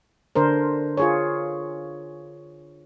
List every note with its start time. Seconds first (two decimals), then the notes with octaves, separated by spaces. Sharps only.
0.35 D3 D4 A#4 C5
0.97 F4 G#4 C#5